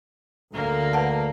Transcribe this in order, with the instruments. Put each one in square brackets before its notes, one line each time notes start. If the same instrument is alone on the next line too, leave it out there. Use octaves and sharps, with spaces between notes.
[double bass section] D2 [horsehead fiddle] A#3
[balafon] B4 F#5 A5